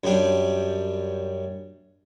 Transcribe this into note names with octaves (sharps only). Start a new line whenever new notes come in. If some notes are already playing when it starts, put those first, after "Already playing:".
F#2 G3 D4